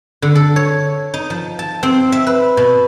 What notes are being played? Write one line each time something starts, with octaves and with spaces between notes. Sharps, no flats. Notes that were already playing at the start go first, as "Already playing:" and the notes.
D3
A4
C#5
D#4
F3
A5
C4
E5
B4
B2